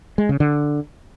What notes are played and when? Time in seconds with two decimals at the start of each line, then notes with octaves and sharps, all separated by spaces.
0.18 G#3
0.29 C#3
0.40 D3